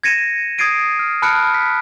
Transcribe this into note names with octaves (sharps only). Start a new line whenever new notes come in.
G#6 A#6 C#7 D#7 E7
D#6 G#6 A6 C7 D7 D#7
F6
A5 B5 F6 F#6 C#7 D7
B6